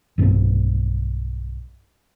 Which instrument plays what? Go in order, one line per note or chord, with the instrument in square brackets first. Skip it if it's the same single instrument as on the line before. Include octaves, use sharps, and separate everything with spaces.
[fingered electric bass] B1 G2 D#3 C4